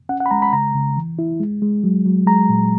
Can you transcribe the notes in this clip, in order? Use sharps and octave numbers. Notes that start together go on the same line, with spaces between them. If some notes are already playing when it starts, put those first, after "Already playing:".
C#4 F#5
F#5
B5
G#3 A#5
B5
C#3 A#5
C#3
E3
E4
G#3
G#3
F#3
F#3
G#3 A#5
A#2